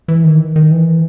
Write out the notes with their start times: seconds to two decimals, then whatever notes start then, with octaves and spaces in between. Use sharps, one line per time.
0.08 E3
0.24 D#3
0.56 D#3
0.71 E3